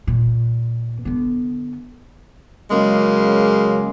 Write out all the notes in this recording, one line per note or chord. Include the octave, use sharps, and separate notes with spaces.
A#2
D3 B3
C#3 F#3 G#3 A#3